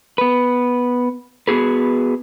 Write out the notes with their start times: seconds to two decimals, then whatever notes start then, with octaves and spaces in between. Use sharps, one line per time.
0.18 B3 B4
1.48 B3 F#4 G#4 B4